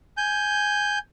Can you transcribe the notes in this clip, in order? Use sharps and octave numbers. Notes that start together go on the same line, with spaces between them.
G#5 G6